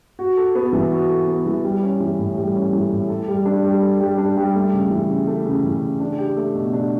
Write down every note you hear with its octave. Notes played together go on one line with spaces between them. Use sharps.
F#4
A4
B3
E3
F#4
A4
B3
E3
G3
C#4
E3
A2
G3
C#4
E3
A2
A4
G3
D4
G3
A4
G3
D4
G3
A3
C#3
E3
C#3
A3
C#3
E3
C#3
D4
G4
A3
B2
D4